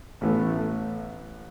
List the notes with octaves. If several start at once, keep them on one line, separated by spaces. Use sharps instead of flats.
A1 A2 E3 A3 B3